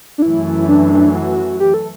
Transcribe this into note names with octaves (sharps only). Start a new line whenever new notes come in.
D4
F#2 E3 A3 E4
D4
F#4
G4
A4